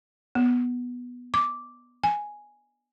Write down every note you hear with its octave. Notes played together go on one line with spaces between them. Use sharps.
B3
D6
G#5